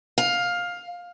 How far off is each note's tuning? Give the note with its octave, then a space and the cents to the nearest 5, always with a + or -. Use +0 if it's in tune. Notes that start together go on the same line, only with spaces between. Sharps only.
F5 +15